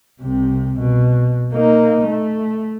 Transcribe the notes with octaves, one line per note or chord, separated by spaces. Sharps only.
C2 C3
B2
A#3 D#4
A3